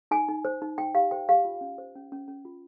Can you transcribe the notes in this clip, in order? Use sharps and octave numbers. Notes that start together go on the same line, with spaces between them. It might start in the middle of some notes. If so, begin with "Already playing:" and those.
D#4 G#5
D#4
C5
D#4
D#4 G5
G4 F5
C5 G5
G4 F5
F4
C#4
C5
C#4
C#4
C#4
F4